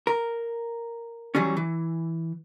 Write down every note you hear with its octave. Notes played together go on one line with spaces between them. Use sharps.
A#4
E3 F#3 G3 C#4
E3